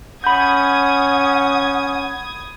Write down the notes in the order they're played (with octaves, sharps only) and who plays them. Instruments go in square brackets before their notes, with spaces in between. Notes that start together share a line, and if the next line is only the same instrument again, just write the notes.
[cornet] C#4 [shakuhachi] F#5 [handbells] B5 G6 [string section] D#6 G#6